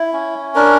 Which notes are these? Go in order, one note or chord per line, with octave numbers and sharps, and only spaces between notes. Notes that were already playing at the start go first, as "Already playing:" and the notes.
Already playing: E4
C#4
D4 A#4